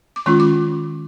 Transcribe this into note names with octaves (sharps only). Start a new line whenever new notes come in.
D6
D#3 G#3 C#4 F4 C#6
D6